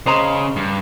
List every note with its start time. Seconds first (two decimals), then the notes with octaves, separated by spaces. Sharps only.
0.06 C#3 C5 D#5 A#5
0.56 G2